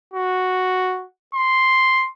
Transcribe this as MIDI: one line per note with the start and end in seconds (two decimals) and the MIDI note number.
0.14 1.04 66
1.34 2.09 84